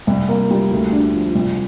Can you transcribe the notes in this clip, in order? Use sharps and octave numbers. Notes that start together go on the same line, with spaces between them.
C2
A#3
G3
D2
D4
F3
C2